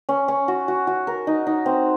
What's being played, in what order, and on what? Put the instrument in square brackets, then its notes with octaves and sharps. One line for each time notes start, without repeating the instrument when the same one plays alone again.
[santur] C#4
C#4
F#4
F#4
F#4
A#4
D#4
D#4
C4